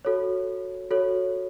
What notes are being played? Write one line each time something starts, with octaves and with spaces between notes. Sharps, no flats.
F#4 A4 C#5
F#4 A4 C#5